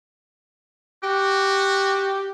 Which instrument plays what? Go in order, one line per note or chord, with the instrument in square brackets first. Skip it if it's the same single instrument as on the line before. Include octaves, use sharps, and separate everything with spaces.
[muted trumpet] F#4 [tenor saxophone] G4